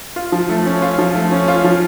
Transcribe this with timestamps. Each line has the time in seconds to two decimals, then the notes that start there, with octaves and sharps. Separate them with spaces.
0.16 F4
0.32 F3
0.49 A3
0.65 C#4
0.82 F4
0.98 F3
1.15 A3
1.31 C#4
1.48 F4
1.64 F3